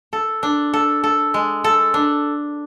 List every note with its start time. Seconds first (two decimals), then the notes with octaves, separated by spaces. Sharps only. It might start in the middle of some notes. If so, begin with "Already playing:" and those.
0.13 A4
0.43 D4
0.74 A4
1.04 A4
1.34 G#3
1.64 A4
1.94 D4